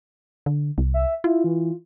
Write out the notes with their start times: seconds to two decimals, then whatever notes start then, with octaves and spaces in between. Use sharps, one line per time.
0.46 D3
0.78 C2
0.94 E5
1.24 E4 F4
1.44 E3